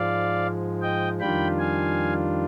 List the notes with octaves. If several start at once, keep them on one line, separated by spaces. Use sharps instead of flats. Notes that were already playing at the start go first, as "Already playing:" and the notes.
Already playing: G#2 F3 G#3 D5 F5
D#5 G5
F2 D#3 G3 D4 F4 G5 B5
F5 G#5